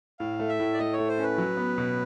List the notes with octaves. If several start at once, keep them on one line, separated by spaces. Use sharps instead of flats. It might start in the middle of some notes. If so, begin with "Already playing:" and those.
A2 F5
A3
E5
A2
D5
A3 D#5
C#5
A3
C5
C#4 B4
F#3
B3
B2